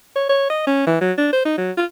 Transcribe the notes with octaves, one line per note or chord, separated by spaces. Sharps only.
C#5
C#5
D#5
C#4
E3
F#3
D4
C5
D#4
F#3
F4